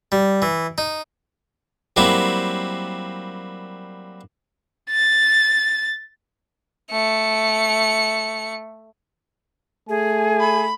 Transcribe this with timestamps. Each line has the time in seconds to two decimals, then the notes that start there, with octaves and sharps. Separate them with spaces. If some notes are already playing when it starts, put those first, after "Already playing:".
0.12 G3
0.42 E3
0.78 D#4
1.96 F#3 G3 A#3 C4 E4
4.90 A6
6.91 A3 C#7
9.89 A3 G#4 G#5
10.40 B5